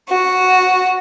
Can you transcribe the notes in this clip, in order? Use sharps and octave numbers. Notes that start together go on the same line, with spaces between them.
F#4